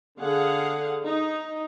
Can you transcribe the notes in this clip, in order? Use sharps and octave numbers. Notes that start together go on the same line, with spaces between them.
D3 G#4 F5 F#5
D#4